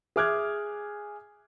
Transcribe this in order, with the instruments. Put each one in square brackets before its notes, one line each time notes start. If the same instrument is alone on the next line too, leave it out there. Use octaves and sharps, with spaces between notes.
[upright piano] G#4 E5 D6 F6 F#6 G#6